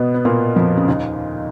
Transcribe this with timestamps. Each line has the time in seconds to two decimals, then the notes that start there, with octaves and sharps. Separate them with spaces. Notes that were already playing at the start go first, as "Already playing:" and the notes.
Already playing: B2 B3
0.14 B3
0.25 A#2 A#3
0.56 F2 F3
0.77 C#3
0.88 D#2 D#3